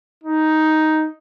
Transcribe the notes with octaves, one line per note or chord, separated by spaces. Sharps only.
D#4